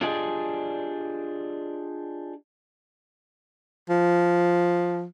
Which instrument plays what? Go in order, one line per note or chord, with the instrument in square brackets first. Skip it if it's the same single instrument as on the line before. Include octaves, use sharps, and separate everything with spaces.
[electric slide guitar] D4 F4 G4 G#4 D5 D#5
[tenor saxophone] F3